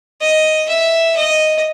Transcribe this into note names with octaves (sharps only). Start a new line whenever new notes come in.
D#5
E5
D#5